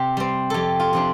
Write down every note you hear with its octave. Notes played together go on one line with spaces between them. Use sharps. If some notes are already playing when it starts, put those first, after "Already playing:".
Already playing: C3 G4
G3 C4
F2 G4 A4
F4
C3 F3 D4